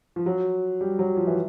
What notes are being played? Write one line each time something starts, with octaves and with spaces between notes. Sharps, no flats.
F3
F#3
G3
F#3
F3
E3